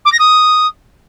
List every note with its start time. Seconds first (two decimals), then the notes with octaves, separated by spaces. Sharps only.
0.05 D6
0.12 A#6
0.19 D#6